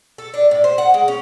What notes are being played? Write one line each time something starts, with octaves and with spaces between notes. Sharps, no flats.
A4
D4
A2
C5
F#5
G#3
C#4